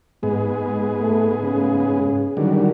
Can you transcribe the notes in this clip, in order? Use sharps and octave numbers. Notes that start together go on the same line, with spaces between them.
G#2 G#3 B3 G#4
A3
C#3
D3 D#3 F#3 G3